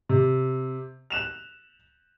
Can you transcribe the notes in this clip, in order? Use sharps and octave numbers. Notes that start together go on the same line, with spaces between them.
C3
F#6 E7 F7